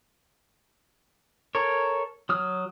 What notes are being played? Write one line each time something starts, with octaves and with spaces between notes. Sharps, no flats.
A4 A#4 C#5
F#3 D#6 F6